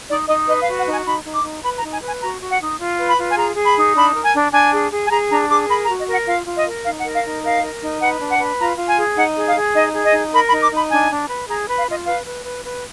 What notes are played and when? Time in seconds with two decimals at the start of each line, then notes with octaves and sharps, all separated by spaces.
0.09 D#4 D5
0.28 D#4 D#5
0.47 B4 D#5
0.62 F5
0.67 F#4
0.77 F#5
0.87 D#4 G#5
1.05 D#4 B5
1.25 D#4
1.34 D6
1.44 D#4
1.63 B4 B5
1.78 A#5
1.83 D#4
1.92 G#5
2.03 B4 G#5
2.21 F#4 A#5
2.41 F#4
2.51 F#5
2.61 D#4
2.80 F4
2.98 B4
3.08 B5
3.18 F4
3.30 G#5
3.37 G#4 A#5
3.56 G#4
3.66 B5
3.76 D#4
3.96 D4 B5
4.14 A#4
4.24 G#5
4.34 D4
4.53 D4 G#5
4.72 G#4
4.92 G#4
5.05 G#5
5.11 G#4 A#5
5.30 D4 A#5
5.50 G#4 D6
5.69 A#4 B5
5.84 A#5
5.89 F#4
5.98 D#5
6.08 A#4 F#5
6.27 F4 F5
6.46 F4
6.55 D#5
6.66 A#4
6.85 D#4 F5
6.99 F#5
7.04 A#4
7.15 F5
7.24 D#4
7.43 A#4 F5
7.62 A#4
7.82 D#4
8.01 B4 F#5
8.20 D4
8.30 F#5
8.39 B4
8.59 F4 A#5
8.78 F4
8.88 G#5
8.97 G#4
9.17 D#4 F#5
9.36 G#4
9.46 F5
9.55 G#4
9.75 D#4 D#5
9.93 G#4
10.04 D#5
10.13 D#4
10.33 A#4 B5
10.48 B5
10.52 D#4
10.62 D6
10.72 D#4 B5
10.90 D4 G#5
11.11 D4
11.29 B4
11.49 G#4 A#5
11.68 B4
11.78 F5
11.88 F4 D#5
12.06 B4 F5
12.26 B4
12.46 B4
12.64 B4